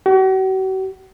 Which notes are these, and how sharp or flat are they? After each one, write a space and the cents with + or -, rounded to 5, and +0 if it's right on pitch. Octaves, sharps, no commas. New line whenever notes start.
F#4 +45